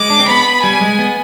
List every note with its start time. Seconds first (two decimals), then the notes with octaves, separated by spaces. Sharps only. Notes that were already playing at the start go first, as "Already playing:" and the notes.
Already playing: G#3 D6
0.10 D4
0.19 C4
0.28 B3 B5
0.63 G3 G#5
0.81 G#3
0.99 B3